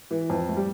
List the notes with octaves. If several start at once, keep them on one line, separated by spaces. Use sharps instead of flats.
E3
F2
A3
G3